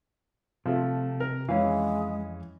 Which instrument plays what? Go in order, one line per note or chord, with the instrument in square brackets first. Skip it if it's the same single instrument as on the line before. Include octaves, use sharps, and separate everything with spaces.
[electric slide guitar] C3 [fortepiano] F3 A3
[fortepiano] A#4
[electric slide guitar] F2 F5 [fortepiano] E3 C#4 [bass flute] G#3